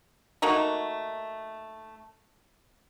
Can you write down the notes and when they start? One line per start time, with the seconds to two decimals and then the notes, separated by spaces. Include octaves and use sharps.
0.42 A3 A#3 D#4 F#4